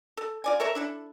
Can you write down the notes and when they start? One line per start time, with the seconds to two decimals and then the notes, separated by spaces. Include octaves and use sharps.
0.17 A4
0.44 F4 D5 G#5
0.60 A4 A#4 C#5 E5
0.75 D4 E4 A4